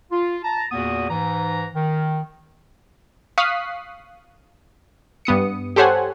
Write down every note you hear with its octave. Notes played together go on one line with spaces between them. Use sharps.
F4
A5 A#5
E2 A#2 A#3 B3 F#4 D#6
G#2 E3 A#5
D#3
F5 C#6 D#6 F#6 B6 C7
G2 B3 D#6 C#7
G4 A4 C5 C#5 F#5 G#5